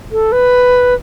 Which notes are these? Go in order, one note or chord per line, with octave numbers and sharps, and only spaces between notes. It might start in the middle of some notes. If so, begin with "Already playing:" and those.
A4
B4